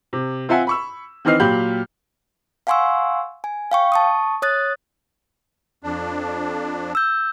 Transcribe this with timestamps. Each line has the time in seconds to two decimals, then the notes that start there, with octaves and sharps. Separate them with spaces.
0.13 C3
0.49 C4 F4 E5 F#5 G#5
0.67 B5 C#6 E6
1.25 D#3 E3 C4 D#5 F6 C7
1.40 A#2 F#3 G4 B5 G6 F#7
2.67 F5 F#5 G#5 C6 C#6 E6
3.44 G#5
3.72 F5 G5 C#6
3.92 A5 C#6 D#6
4.42 C#5 D#6 F#6 A6
5.83 F2 D4
6.95 E6 G6